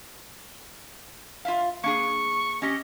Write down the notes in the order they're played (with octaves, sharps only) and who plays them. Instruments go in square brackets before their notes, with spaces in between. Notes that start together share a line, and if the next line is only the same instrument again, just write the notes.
[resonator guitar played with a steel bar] F4 E5 F5
[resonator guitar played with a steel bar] A#3 D4 G#4 [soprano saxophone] C#6
[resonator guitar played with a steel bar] C#4 G4 [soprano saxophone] D#5